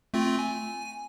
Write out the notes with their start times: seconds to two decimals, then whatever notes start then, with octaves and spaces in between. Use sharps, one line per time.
0.14 A3 C4 F4
0.39 G#5